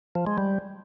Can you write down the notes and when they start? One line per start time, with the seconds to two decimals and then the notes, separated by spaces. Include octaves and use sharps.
0.15 F3
0.27 G#3
0.38 G3